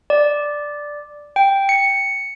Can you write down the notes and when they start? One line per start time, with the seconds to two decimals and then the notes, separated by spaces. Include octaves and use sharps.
0.10 D5
1.36 G5
1.69 C#7